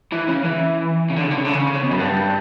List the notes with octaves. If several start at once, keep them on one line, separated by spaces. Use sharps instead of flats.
E3
C#3
E3
C#3
D3
C#3
D3
C#3
D3
C#3
C#3
B2
F#2
G2